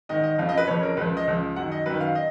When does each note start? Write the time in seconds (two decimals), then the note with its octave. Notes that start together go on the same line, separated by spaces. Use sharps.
0.09 G#2 D#3 D#5
0.24 D#5
0.38 F2 C#3 F3 F5
0.49 D#5
0.58 B4
0.67 F2 C#3 F3 C#5
0.83 A#4
0.97 C#2 C#3 F3 B4
1.17 D#5
1.27 C#2 C#3 F3
1.56 F#2 D#3 F#5
1.71 D#5
1.86 F#2 D#3 B4
2.00 F5
2.15 D#5